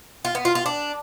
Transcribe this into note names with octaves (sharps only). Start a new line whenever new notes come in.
F4
B3
F4
F4
D4